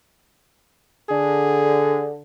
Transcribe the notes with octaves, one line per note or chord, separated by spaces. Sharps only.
D3 G#4